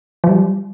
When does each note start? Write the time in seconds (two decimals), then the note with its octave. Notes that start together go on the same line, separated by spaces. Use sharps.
0.24 F3
0.29 G3